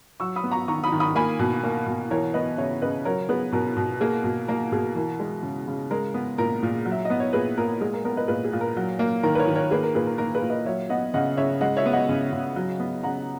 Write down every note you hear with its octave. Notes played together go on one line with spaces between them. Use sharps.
F#3 C#6 E6
B5 D#6
B3
A#5 C#6
D#3 A#5 C#6
B5 D#6
D#3
B5 D#6
A#3 G#5 B5
B2
A#3
B2
E3 A#4 C#5
B3 B4 D#5
C#3 C#5 E5
C#3 B4 D#5
F#3 A#4 C#5
B3 G#4 B4
B2 A#4
B2
A#3 G#4
B2
A#3 A#4
B2 G#4
E3 A#4
G#3
C#3
C#3
G#3 A#4
B3
A#2 A#4
A#2
F#3
E5
B3 D#5
C#5
A#2 G#4 B4
A#2 A#4
G#3 G#4
A#4
B3 A#4
B4 D#5
A#2 G#4 B4
G#4
A#2
A#4
F#3
A#3
D#3 A#4
B4
A#4 C#5
D#3
A#4 C#5
A#3 G#4 B4
A#4
A#2 G#4 B4
A#4
A#3 A#4
G#4 B4
A#2
B4 D#5
F#3 C#5 E5
B3 D#5 F#5
C#3 D#5 F#5
C#3 C#5 E5
G#3 D#5 F#5
C#5 E5
B3
D#5 F#5
C#3
C#3
F#3
B3
C#3 F#5 A#5